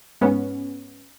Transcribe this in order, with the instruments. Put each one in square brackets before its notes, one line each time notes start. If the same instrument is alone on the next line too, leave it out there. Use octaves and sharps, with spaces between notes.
[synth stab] G#2 B3 C#4